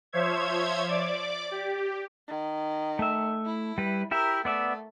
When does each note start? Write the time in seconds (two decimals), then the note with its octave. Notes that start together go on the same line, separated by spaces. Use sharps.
0.13 F3 C5 C#5 E5 G#6
0.88 D5 D6
1.51 G4
2.28 D#3
2.99 A3 E5
3.45 E4
3.78 G3 B4
4.11 E4 G4 A#4 E5
4.45 A3 B3 D5 E5